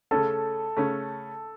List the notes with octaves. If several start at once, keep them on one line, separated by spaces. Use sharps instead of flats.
C#3 A3 C#4 A4 A5
C#3 A3 C#4